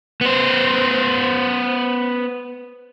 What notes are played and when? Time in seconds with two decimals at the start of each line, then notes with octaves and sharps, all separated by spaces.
0.21 B3 C5